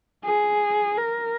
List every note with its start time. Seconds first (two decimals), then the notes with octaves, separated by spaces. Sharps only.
0.25 G#4
0.97 A#4